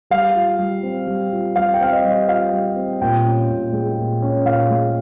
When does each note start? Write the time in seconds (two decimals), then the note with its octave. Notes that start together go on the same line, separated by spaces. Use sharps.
0.10 G3 F5
0.36 F4
0.59 G3
0.83 C4
1.07 G3
1.32 F4
1.56 G3 F5
1.74 G5
1.80 C4 F5
1.92 D#5
2.04 G3
2.29 F4 F5
2.53 G3
2.76 C4
3.01 A#2 G5
3.25 C#4
3.49 A#2
3.73 G#3
3.98 A#2
4.22 C#4
4.46 A#2 F5
4.70 G#3